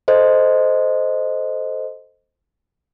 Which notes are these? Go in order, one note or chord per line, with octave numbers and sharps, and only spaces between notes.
A4 C5 D#5